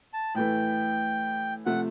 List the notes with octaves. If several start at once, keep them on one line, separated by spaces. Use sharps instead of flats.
A5
A2 E3 A3 G5
C3 F3 A3 F#5